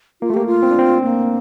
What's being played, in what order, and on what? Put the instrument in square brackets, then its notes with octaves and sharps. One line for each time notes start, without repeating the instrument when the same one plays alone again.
[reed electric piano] A#3 [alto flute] F4
[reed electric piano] A3
[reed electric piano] A#3 [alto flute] G4
[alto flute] F4
[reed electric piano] C4
D4
C4
[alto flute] A#3